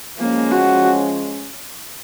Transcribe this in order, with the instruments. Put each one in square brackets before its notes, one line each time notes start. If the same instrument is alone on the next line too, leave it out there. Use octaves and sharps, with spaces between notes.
[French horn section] F3 G#3 C#4 [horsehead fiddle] A#3
[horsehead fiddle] F#4